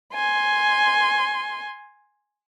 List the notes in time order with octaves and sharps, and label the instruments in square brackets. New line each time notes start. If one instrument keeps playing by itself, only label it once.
[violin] G#5 C6